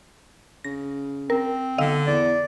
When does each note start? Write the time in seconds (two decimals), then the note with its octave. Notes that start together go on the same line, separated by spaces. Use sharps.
0.65 C#3 A#6
1.30 C4 A#4
1.78 B1 D3 D#5 F5 E6
2.07 E2 D5